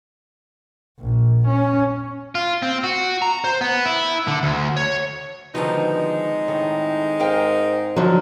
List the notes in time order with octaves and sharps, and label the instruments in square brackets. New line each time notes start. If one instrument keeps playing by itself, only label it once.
[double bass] A#1
C#4
[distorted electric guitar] F4
C4
F#4
A#5
C5
B3
E4
D3
D2
C#5
[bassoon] B2 [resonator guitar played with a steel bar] D3 D#3 F3 [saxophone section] G#3 C4 D#4
[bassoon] A2 [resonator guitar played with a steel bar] D#3
[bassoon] G#2 [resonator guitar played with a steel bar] A#4 F5 G5
[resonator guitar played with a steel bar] D3 [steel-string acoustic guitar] F3 F#3